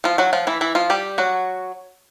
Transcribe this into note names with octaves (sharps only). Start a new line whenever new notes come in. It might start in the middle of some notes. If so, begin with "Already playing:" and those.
F3 F4
F#3 F#4
F3 F4
E3 E4
E3 E4
F3 F4
G3 G4
F#3 F#4